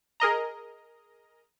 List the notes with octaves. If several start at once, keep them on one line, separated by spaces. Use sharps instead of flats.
G#4 A#4 D#5 A#5